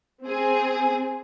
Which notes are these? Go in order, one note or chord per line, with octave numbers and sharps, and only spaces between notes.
C4 G#4